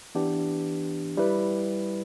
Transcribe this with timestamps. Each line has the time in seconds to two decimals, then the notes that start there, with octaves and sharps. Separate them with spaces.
0.15 E3 B3 D4 G4
1.17 G3 E4 B4